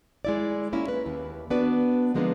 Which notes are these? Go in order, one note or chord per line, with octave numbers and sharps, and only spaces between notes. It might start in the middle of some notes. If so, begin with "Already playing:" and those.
G#3 E4 D5
A#3 C#4 E4
B4
D#2
B3 D4 F#4 B4 D5
D3 F3 G#3 A#3 B3 D4